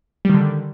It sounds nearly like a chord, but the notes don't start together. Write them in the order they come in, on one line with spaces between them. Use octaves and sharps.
G3 D#3 D3